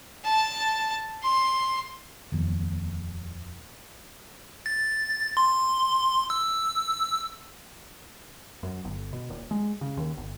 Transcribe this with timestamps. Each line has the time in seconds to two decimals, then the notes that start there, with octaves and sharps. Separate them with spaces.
0.24 A5
1.23 C6
2.32 D#1 F2
4.66 A6
5.37 C6
6.30 E6
8.63 F#2
8.84 G1
9.13 B2
9.30 D#1
9.51 G#3
9.81 C#3
9.97 D#2
10.17 G1